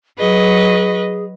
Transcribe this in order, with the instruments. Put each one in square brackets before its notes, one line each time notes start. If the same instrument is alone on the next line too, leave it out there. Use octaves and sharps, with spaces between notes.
[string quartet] F#3 B4 D#5 [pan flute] G#4